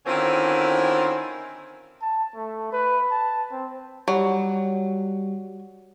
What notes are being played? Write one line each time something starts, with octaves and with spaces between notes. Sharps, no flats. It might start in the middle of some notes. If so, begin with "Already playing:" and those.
D3 D#3 C4 C#4 E4 F4
A5
A3
B4
A5
C4
F#3 G3